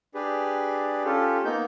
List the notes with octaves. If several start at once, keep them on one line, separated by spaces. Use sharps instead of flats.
D4 G4 G#4 B4
C#4 F4 G4 A4
A#3 B3 D#4 G6